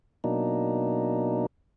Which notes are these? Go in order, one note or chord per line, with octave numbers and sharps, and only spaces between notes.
B2 F#3 A#3 D4 D#4